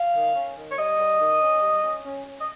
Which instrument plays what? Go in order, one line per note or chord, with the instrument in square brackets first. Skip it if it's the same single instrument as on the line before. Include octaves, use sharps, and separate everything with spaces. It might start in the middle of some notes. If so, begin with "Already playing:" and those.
Already playing: [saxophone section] F5
D#3
C#4
D#3
C#5
G3 D#5
G3
D#3
C#4
G3
C#4
C#4
C#4
D#5